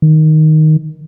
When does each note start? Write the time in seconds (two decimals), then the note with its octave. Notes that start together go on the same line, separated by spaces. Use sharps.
0.02 D#3